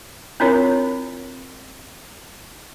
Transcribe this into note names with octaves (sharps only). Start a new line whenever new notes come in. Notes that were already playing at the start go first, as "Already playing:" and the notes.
C4 D4 E4 F4 A#4 C#5